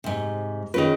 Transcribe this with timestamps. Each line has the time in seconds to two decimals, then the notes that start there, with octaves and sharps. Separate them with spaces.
0.04 G#2 C3
0.74 D#3 C#4 F4 G#4 B4